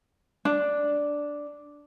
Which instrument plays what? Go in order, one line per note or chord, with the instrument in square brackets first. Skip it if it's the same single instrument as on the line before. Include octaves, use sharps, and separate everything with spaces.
[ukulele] D4